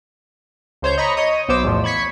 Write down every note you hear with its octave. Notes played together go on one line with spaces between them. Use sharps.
C#2 C5 C#5 G6
D#5 A#5 B5 C#6
C#5 D#5 D#6
B1 B3 C5 D6 E6
E2 A2 F3
B5 C#6 G#6 B6 C#7